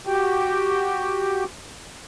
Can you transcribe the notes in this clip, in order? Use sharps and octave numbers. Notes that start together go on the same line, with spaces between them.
F#4 G4 G5